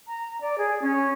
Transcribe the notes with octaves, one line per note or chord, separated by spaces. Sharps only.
A#5
D5
G#4
C#4